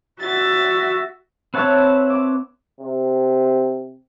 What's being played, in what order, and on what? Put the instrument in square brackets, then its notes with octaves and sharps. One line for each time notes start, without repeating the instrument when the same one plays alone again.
[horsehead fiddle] F#4 E5 [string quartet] A6
[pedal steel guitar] C4 F#5 A5 [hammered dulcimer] B4 C#5 E5
[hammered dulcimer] D6
[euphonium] C3